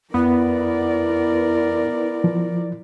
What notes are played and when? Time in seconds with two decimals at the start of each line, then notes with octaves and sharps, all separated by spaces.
0.14 F2 B3 E4 A#4 D5
2.24 F3